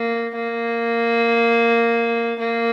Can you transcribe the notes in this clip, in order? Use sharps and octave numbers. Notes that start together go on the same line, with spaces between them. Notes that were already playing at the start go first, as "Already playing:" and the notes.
Already playing: A#3
A#3
A#3